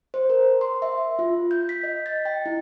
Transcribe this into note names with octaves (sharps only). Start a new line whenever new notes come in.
C5
A#4
C6
E5
F4
G6
B6
D#5
A6
G5
E4